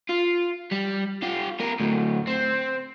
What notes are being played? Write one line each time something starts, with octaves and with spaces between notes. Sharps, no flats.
F4
G3
F4 G4
B3 A#4
D2 A2
C4